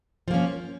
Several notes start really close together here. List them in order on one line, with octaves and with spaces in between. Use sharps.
F3 A#3 C#4